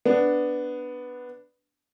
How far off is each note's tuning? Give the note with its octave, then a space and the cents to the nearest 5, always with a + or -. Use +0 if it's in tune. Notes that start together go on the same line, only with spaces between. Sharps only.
B3 +0 D4 +0